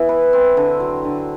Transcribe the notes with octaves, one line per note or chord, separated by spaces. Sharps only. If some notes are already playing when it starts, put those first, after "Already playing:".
Already playing: E3 B3 E4
B4
C4
D3
F#3
D3